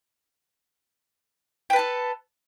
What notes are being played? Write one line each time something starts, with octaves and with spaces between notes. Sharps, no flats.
A4 B4 G5 A5